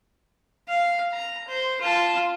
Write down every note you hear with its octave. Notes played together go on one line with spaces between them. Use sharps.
F5
A#5
C5
F4 A5